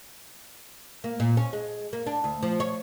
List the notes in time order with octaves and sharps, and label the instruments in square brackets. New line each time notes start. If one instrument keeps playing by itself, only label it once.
[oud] A#3
A#2
C#4
G#3
A#3
D4
D2
F3
C#5